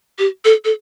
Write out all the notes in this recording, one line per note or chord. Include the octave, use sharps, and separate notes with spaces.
G4
A4
A4